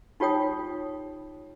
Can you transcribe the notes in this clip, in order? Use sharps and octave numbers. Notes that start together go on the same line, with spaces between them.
D#4 F4 G4 C#5 G5 D#6